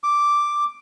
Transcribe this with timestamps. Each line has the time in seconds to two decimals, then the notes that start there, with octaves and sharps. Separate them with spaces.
0.03 D6